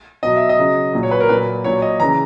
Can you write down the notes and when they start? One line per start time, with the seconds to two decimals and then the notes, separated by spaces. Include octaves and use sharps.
0.23 B2 F#3 D#5
0.36 E5
0.49 D#5
0.59 C#3 F#3
0.93 A#2 F#3
1.03 C#5
1.11 B4
1.20 A#4
1.29 A#2 F#3 B4
1.64 A#2 F#3 C#5
1.82 D#5
2.00 C#3 E3 A#5